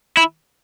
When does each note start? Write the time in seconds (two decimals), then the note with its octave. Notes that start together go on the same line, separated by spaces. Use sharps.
0.17 E4